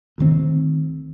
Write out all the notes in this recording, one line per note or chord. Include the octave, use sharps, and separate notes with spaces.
D2 D#3 C4